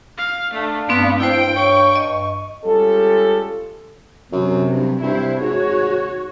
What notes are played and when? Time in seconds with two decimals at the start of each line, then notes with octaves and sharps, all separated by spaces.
0.18 F5
0.54 A3 D4 F5
0.89 G2 A3 B3 C4
1.20 E4 C5 G5 D7
1.56 C#5 C#6
1.96 D#5
2.65 G3 G#3 C#4 F4 G4 A4
4.32 F#2 C3 F#3
4.73 G2
5.03 G2 C3 E4 C5
5.40 G#2 F#4 C#5